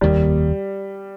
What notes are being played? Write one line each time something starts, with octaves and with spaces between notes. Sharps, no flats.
F1 D#2 D#3 G3 A#3